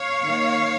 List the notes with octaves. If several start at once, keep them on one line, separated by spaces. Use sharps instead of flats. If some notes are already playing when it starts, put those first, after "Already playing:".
Already playing: C#5 F5
D#3 A#3